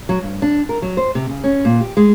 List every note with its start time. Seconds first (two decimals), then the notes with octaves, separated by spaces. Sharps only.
0.09 F#3
0.23 G2
0.42 D4
0.69 A#4
0.82 F#3
0.97 C5
1.15 C3
1.29 C#3
1.44 C#4
1.65 A#2
1.81 G4
1.97 G#3